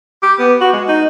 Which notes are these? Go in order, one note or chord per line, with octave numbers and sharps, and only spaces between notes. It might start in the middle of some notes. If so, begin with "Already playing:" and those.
G4
B3
F#4
G#3
D#4